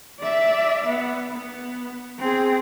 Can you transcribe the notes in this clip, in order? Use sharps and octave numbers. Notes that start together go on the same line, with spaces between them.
D5 E5
B3
B3
C4 G#4